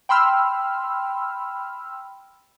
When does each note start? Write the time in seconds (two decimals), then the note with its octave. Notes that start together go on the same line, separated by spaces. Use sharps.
0.09 G5 B5 C6 E6 F6